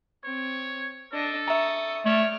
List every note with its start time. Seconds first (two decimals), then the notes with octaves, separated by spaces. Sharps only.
0.24 C4 C#5
1.13 D4 A4 D#5
1.48 E5 A#5 C#6 D#6
2.05 A3 C#5 D5 F6